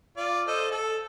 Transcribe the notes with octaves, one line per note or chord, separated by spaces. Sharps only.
F4 D5
A4 C5 D#5
A4